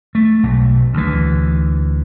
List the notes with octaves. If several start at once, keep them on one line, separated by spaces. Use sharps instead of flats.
A3
B1
D2 E3